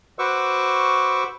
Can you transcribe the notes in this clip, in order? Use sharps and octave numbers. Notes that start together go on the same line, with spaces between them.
F#4 B4 C5 C#6 D6 E6